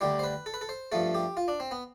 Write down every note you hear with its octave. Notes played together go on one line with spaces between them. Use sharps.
D2 D3 G3 G4
C5
B4
A4
B4
A4
C5
G2 F3 A3 A4
G4
F4
D4
C4
B3